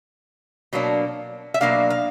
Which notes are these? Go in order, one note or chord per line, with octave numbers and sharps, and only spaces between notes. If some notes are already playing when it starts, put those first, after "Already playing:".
B2 F#3 A#3 D4
E5
B2 F#3 A#3 D4 F5
F5